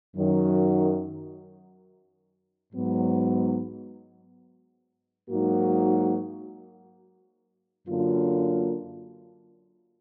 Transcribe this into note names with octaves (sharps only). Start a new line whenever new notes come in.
F#2 D#3 F#3
G#2 F#3 B3
G#2 F#3 A#3 D#4 F#4
F#2 D3 F#3 A#3 F4